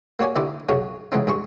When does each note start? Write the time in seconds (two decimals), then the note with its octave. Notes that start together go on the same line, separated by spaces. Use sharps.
0.19 A#3 F#4 C#5 D5 G#5
0.36 D3 D#4 E4 G4 C5 D5
0.69 B1 F#2 C#3 F#3 G#4 C#5
1.12 C#3 E3 G#3 B3 C4 D#4
1.27 G2 G#4 C6 C#6